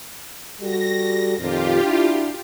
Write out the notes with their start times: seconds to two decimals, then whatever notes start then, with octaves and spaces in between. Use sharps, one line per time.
0.61 G3 F#4 A4 A#6
1.38 F2 A#2 D#3 F4 G4
1.83 D4 E4 F#4